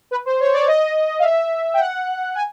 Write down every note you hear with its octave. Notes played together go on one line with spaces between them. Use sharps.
B4
C5
C#5
D5
D#5
F5
E5
G5
F#5
G#5